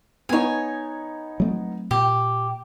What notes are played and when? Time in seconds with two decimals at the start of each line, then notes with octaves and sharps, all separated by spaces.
0.29 B3 D#4 C#5 G#5
1.40 F#3 A3 C4
1.91 A#2 G4